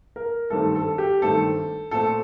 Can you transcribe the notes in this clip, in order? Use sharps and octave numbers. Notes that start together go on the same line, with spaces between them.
A#4
G2 D#3 A3 C4 A4
A4
G4
G2 D#3 A3 C4 A4
A#2 A3 C4 A4